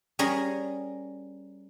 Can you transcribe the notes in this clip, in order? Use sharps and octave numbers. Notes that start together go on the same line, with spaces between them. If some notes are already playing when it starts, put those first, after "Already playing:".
G3 C#4 G#4 A#4